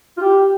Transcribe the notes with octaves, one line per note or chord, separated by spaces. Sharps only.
F4
G4